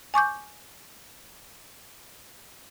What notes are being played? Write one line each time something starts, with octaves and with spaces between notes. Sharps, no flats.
G#5 C#6 D6 G6